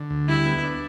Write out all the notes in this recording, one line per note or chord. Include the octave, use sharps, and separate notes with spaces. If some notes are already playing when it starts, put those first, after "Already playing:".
Already playing: D3
D2
G3 E4
B3
D4